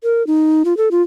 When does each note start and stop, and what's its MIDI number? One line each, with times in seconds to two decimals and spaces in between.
0.04 0.25 70
0.27 0.63 63
0.65 0.76 65
0.77 0.89 69
0.91 1.02 65